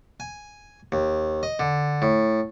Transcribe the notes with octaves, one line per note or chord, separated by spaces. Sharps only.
G#5
D#2
D#5
D3
A2